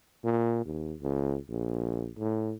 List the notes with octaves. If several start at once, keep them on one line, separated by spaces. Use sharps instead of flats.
A#2
D#2
C#2
A#1
A2